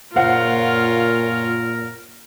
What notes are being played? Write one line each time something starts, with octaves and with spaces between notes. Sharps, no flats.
F#1 A#2 F4 A#4 C#5 F5 F#5